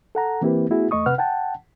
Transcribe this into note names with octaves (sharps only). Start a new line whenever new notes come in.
A4 F#5 A#5
E3 A#3 C4 E4 G4 B4
A3 B3 E4 F#4 G#4
E2 A3 D#5 C#6 D#6
C3 B4 F#5 F6
F#5 G5 A5